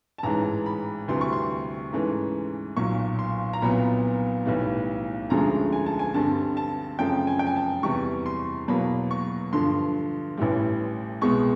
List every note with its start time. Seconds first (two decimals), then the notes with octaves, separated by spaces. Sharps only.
0.18 A5
0.23 A1 G#2 E3 A#5
0.66 B5
1.08 D2 C3 E3 G3 C4 C6
1.21 C#6
1.33 C6
1.92 G#2 E3 A3 C#4
2.77 B1 A#2 F#3 C#6
3.19 C6
3.53 A#5
3.62 C2 A#2 F#3 B3 B5
4.46 B1 A2 E3 G3
5.30 D2 D3 F3 G#3 C#4 A#5
5.73 G#5
5.86 A5
5.99 G#5
6.14 G2 D3 G3 C4 A5
6.57 A5
6.99 F#2 C#3 F3 A3 C4 G5
7.27 G#5
7.39 G5
7.47 G#5
7.56 A5
7.83 E2 C3 E3 G3 C#6
8.26 C6
8.68 E2 B2 F#3 A#3 B5
9.11 C#6
9.53 G2 D3 F3 C6
10.38 A1 A2 E3 G3
11.21 C2 B2 G#3 B3 C#6